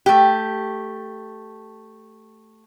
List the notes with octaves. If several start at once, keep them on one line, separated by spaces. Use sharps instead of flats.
A3 G4